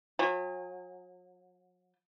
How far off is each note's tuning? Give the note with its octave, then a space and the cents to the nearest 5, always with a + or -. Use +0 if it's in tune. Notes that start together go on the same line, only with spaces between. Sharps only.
F#3 -40 G#5 -35